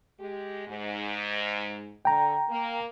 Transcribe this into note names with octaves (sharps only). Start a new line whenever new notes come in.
G#3 G4
G#2
D3 G5 A#5
A#3